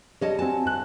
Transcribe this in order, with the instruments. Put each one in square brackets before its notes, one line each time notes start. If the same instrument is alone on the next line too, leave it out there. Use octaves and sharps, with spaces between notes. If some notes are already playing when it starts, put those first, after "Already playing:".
[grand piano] G3 [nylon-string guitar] C#5 D#5 A5
[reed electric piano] C4 F#4 G#5 [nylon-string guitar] A5
[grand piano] G1 F#6